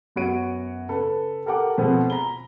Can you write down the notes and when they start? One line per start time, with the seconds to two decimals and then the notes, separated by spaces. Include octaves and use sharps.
0.16 F#2 B3 F#4 C#5 D7 D#7
0.89 C#3 A4 B4
1.46 G4 A4 A#4 F#5 G5 D6
1.78 B2 F3 G#3 A3 B3 C4
2.10 A#5 B5 G7